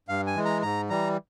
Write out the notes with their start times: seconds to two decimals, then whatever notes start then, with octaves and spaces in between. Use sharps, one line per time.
0.09 G2 F5
0.27 G#5
0.36 E3 G#3
0.45 A#5
0.62 G#2 A#5
0.90 E3 G3 A#5